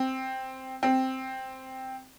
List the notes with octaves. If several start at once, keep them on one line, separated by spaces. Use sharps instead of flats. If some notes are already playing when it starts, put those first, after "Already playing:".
Already playing: C4
C4